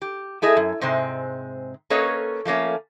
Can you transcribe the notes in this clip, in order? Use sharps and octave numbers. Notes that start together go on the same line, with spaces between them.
G4
A3 E4 G#4 D#5
F#2
G#2 C3 G#3 C4
A#3 C#4 A4 B4 C#5 D#5
F3 A3 A#3 C#4